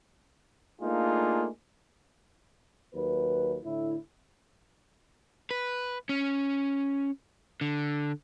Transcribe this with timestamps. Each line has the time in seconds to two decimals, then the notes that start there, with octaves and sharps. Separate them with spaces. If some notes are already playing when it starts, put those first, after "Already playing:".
0.80 A3 A#3 D4 D#4 F4 G#4
2.95 D#2 F#3 B4
3.64 A2 D3 E4
5.51 B4
6.09 C#4
7.61 D3